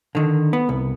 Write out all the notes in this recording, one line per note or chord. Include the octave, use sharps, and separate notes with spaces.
D3 D#3
B3
C2